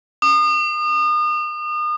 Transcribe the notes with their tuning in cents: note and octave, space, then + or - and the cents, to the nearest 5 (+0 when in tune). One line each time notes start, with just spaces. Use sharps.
D#6 -35